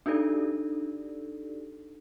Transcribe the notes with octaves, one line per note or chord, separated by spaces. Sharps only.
D4 D#4 F#4 G4 A4 D5